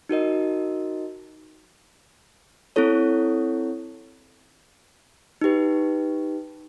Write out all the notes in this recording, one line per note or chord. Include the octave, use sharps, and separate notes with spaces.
D#4 F#4 A#4 D#5
C4 E4 A4 C#5
D#4 G4 B4